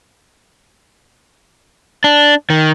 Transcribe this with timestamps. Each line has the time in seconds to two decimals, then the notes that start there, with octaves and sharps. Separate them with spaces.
2.04 D4
2.50 D#3